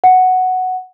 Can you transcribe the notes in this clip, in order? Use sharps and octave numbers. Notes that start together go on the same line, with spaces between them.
F#5